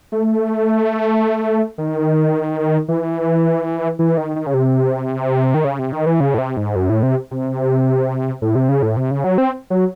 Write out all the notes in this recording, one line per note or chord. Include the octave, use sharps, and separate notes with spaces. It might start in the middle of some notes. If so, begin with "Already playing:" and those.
A3
D#3
E3
E3
D#3
D#3
C#3
C3
D#3
C#3
C3
D#3
E3
C#3
A2
C3
G#2
F#2
A2
C3
C3
A2
C3
C#3
A2
C3
C#3
F#3
C4
F#3